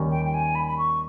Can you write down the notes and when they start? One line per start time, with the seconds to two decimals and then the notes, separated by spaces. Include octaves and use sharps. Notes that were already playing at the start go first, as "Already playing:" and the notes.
Already playing: D#2 D#3 G3 C#4
0.10 G5
0.25 G5
0.34 G#5
0.55 B5
0.67 B5
0.78 C#6